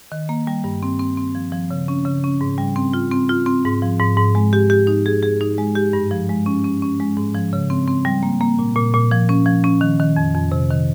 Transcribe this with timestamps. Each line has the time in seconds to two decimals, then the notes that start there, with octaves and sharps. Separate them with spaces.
0.12 D#3
0.29 A#3
0.47 G3
0.64 G2
0.83 C4
0.99 C4
1.17 C4
1.35 F3
1.52 F3
1.71 C#3
1.88 C#4
2.05 C#3
2.24 C#4
2.41 G#2
2.58 G3
2.76 C4
2.93 F4
3.11 C4
3.29 F4
3.46 C4
3.65 G#2
3.82 F3
4.00 G#2
4.17 G#2
4.35 G#3
4.53 G4
4.70 G4
4.87 D#4
5.06 G#4
5.23 G#4
5.41 D#4
5.58 G#3
5.75 G4
5.93 G2
6.11 F3
6.29 G#3
6.46 C#4
6.64 C#4
6.82 C#4
7.00 G#3
7.17 G#2
7.35 F3
7.53 C#3
7.70 C4
7.88 C4
8.05 G3
8.23 A#3
8.41 A#3
8.59 A#2
8.76 A#2
8.94 A#2
9.11 F3
9.29 C#4
9.46 F3
9.64 C#4
9.81 D#3
10.00 D#3
10.17 F2
10.34 F2
10.52 C3
10.70 D#3